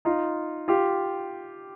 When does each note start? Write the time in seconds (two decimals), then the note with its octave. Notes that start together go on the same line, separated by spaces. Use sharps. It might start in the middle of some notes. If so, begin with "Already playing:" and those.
0.05 D#4 F4
0.68 F4 G4